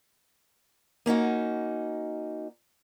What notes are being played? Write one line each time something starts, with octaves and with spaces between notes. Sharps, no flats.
A#3 C#4 D#4 F#4